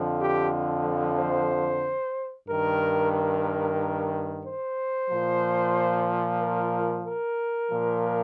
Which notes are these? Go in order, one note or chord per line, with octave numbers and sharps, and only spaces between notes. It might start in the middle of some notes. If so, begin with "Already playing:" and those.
Already playing: F2 D3 F3
G4
C5
G2 D#3 A#4
A#4
C5
A#2 F3
A#4
A#4
A#2 F3